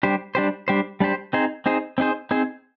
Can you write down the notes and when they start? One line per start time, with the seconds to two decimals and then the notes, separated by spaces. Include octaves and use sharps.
0.03 G3 D4 G4 C5
0.35 G3 D4 G4 C5
0.68 G3 D4 G4 C5
1.00 G3 D4 G4 C5
1.33 C4 D#4 G#4 C5
1.66 C4 D#4 G#4 C5
1.98 C4 D#4 G#4 C5
2.31 C4 D#4 G#4 C5